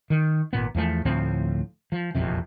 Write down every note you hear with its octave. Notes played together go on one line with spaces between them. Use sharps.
D#3
G#1 A#2 B3
E2 F3 A3
D2 A2 F3 C4
F3
E1 A#1 F2 C3